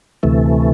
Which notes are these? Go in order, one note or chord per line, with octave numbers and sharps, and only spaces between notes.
D2 C3 E3 A3